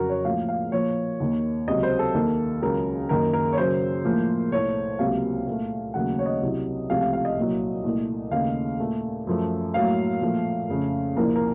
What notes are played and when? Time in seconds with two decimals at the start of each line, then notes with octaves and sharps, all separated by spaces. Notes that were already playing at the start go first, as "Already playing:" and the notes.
Already playing: F2 C#3 F#3 F#4 A#4
0.09 C#5
0.25 A2 F3 A#3 F5
0.49 F5
0.72 A#2 F3 A#3 C#5
1.20 D#2 D#3 A#3
1.67 C#2 C3 F#3 D#5
1.83 C5
1.99 A4
2.14 D#2 D#3 A#3
2.62 C#2 C#3 F#3 A#4
3.09 F#2 D#3 A#3 A#4
3.33 A#4
3.53 C#5
3.57 F#2 C#3 F#3 C5
4.05 A2 F3 A#3
4.52 C2 A#2 A3 C#5
4.99 C#2 C3 F#3 A#3 F5
5.46 A#2 A3
5.94 D#2 C#3 F#3 A3 F#5
6.19 C#5
6.26 D#5
6.42 C2 C3 F#3
6.90 C#2 C3 F3 A3 F5
7.01 F5
7.13 F5
7.25 D#5
7.37 C2 A#2 F#3
7.84 C2 A#2 A3
8.31 D#2 C#3 A3 F5
8.79 A#2 A3
9.27 F#2 F3 A3
9.74 A2 F#3 A#3 F5
10.21 A#2 F3 A3
10.69 F2 C#3 A3
11.16 C2 A#2 F3 A#3 A#4
11.36 A#4